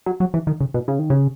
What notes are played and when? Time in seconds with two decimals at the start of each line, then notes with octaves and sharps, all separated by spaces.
0.06 F#3
0.20 F#3
0.34 E3
0.47 D#3
0.61 C#3
0.74 B2
0.88 C#3
0.99 D#3
1.10 C#3